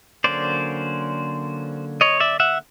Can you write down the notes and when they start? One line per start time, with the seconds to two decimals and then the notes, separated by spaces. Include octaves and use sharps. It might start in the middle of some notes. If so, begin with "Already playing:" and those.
0.24 D3 F#3 A#3 C#4 C5 D5
2.01 C#5 D#5
2.20 D5 E5
2.40 E5 F#5